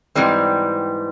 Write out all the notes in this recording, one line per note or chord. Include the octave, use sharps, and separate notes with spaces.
G#2 E3 G3 C4